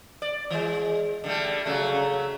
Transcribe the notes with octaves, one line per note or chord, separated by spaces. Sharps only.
D5
E3 G#3
D3 G3 A3
C#3 F#3 A3